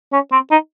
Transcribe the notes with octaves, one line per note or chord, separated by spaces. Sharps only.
C#4
C4
D#4